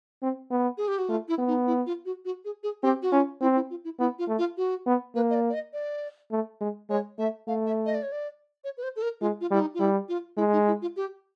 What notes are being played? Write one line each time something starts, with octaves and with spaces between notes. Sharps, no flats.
C4
B3
G#4
G4
F#4
A3 F4
E4
B3
D#4
E4
F4
F#4
F#4
G#4
G#4
C4 G4
F#4
C#4 F4
C4 E4
E4
F4
E4
B3 E4
F4
A3
F4
F#4
B3
A#3 B4
D#5
D5
D5
D#5
D5
A3
G#3
G#3 C#5
A3 E5
A3 F5
E5
D#5
D5
C#5
D5
C#5
B4
C5
A4
A#4
G#3 F4
F4
G3 E4
D#4
F4
G3 E4
F4
G#3 E4
D#4
E4
F4
G4